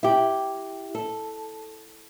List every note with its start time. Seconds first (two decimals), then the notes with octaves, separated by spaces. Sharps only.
0.03 E4 G4
0.95 A4